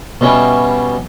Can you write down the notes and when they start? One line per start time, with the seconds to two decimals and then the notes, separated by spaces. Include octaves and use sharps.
0.21 B2 G3 C#4 E4